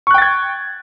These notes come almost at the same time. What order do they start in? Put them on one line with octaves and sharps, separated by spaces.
C#6 F#6 G5 A6 G#6